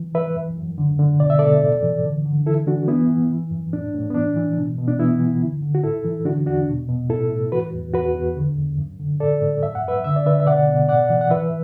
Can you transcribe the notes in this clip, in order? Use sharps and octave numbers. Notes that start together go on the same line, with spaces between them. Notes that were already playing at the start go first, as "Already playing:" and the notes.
Already playing: E3
E3 B4 E5
F#2
F#2
D3
D3
B2 D5
E5
B2 A4 D5
A2
E3
D3
D3
E3 E4 A4
E3 D4 F#4
E3 B3 E4
E3
E3
F#2
A2 D4
A2
B3
E3 D4
E3
B2
B2
D4
E3 B3 E4
E3
D3
D3
F#4
A2 E4 A4
E3
D3 D4 F#4
E2 D4 F#4
B2
B2
A2 E4 A4
A2
E3 F#4 B4
E2
E2 F#4 B4
E2
D3
E2
F#2
D3
A2 A4 D5
A2
F#2 E5
F#5
F#2 B4 E5
D3 E5
D5
D3 B4 E5
E5
B2 D5 F#5
B2
A2 D5 F#5
E3
F#5
E3 B4 E5